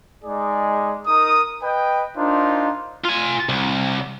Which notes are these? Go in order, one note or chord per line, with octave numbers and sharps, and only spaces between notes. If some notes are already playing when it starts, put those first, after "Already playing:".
G#3 D#4 G#4 D5
D#4 A#4 D#6
B4 D#5 G5
D4 D#4 F4 A#4 C5
F4 G#5
C2